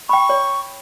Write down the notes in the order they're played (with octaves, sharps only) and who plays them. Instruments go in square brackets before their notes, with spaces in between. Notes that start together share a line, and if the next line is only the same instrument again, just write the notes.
[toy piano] G5 B5 [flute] C#6
[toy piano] C#5